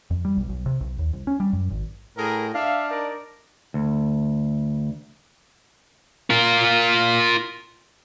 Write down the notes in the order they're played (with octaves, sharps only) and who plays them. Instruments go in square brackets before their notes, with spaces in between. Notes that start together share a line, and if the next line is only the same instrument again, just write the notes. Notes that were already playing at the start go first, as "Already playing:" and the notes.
[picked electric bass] F2
G3
B1
B1
C3
B1
D#2
C2
C#4
G3
F#2
G#1
[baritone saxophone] A2 [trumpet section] G#4 A#4
[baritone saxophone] D4 [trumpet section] E5 F5
[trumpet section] D#4 A#4 D5
[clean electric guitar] D2
[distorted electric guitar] F4 A#4